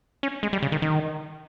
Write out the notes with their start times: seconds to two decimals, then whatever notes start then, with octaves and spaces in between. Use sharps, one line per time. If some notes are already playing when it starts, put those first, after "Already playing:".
0.23 C#4
0.43 G#3
0.53 G3
0.63 C#3
0.72 D#3
0.82 D#3